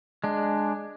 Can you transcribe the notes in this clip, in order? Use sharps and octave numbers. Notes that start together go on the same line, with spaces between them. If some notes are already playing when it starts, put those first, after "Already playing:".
G#3 D4